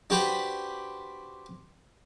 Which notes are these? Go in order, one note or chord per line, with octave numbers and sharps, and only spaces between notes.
D4 F#4 G4 B4 C5 B5